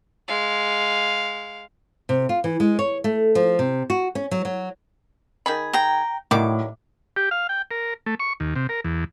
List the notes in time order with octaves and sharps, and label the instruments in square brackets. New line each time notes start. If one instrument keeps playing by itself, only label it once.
[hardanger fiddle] G#3 F5
[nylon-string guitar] C3
F4
E3
G#3
C#5
A3
F3
C3
F#4
C#4
F#3
F#3
[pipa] D#3 G#4 B5
[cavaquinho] G5 A#5
[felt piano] A2 [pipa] D#3 F#3 G3 [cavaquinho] D6
[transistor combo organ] G4
F5
G5
A#4
A3
C#6
D#2
C3
A#4
E2